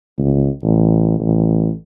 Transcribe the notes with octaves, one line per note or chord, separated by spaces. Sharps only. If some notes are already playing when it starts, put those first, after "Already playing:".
C#2
A1
A1